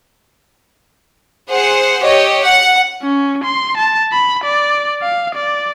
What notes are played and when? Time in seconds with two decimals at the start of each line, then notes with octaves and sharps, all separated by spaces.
1.49 G#4 C5 F#5
2.04 G4 C#5 D#5
2.44 F#5
3.03 C#4
3.44 C6
3.77 A5
4.12 B5
4.44 D5
5.02 F5
5.35 D5